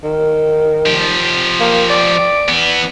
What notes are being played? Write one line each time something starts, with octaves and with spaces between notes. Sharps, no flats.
D#3
F3 G4
A#3
D5
E3 B3